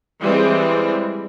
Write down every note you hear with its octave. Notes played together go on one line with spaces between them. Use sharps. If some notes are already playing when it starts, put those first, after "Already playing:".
E3 G3 G#3 C4